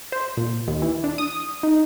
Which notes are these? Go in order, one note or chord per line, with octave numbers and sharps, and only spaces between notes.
C5
A#2
D#2
E3
D4
D#6
D#4